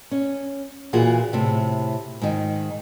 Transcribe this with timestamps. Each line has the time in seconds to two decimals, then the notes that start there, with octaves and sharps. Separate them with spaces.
0.11 C#4
0.93 A#2 E3 F4 F#4 G#4
1.33 A2 C3
2.21 G#2 D#3